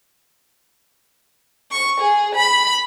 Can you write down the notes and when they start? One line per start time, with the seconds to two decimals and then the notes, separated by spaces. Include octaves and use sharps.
1.71 C#6
2.00 G#4
2.35 B5